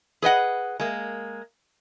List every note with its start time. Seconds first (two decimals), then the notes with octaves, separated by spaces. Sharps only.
0.22 G#4 B4 D#5 F#5
0.80 G#3 A#3